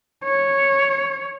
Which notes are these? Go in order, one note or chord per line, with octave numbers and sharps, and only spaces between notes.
C#5